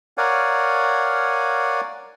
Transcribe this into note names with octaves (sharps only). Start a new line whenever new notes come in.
A#4 C#5 D5 F5 F#5 G#5